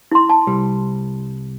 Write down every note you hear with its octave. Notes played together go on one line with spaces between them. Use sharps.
E4 C6
A5
C2 G3